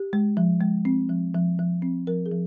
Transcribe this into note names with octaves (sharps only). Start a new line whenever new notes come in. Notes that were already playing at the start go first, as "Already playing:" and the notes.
Already playing: G4
G#3
F3
G#3
C4
F3
F3
F3
C4
F3 A#4
G#4
F3